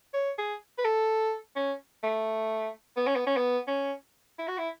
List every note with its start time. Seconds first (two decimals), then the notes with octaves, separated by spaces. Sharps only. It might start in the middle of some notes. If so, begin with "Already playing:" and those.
0.14 C#5
0.38 G#4
0.79 B4
0.85 A4
1.56 C#4
2.03 A3
2.97 B3
3.07 C#4
3.16 B3
3.27 C#4
3.37 B3
3.67 C#4
4.39 E4
4.48 F#4
4.58 E4